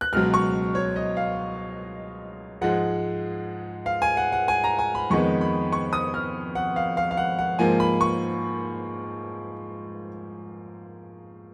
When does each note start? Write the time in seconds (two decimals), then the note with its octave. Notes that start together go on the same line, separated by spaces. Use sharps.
0.01 F#6
0.13 C#2 B2 F#3 F6
0.34 C#6
0.75 C#5
0.96 D#5
1.17 F5
2.61 G#2 F3 G#3 F#5
3.86 F5
4.02 G#5
4.17 F#5
4.32 F#5
4.48 G#5
4.64 A#5
4.79 G#5
4.95 B5
5.10 F2 D#3 G#3 B3 C#6
5.41 B5
5.72 C#6
5.93 D#6
6.14 F6
6.55 F#5
6.76 F5
6.97 F5
7.11 F5
7.17 F#5
7.39 F#5
7.59 G#2 F3 A#3 G#5
7.80 B5
8.01 C#6